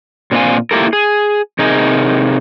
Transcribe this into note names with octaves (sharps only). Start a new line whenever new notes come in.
A#2 C4 D4 F5 G#5
A#3 E4 F4 G4 A4 A#4
G#4
C3 D#4 G#4 A#4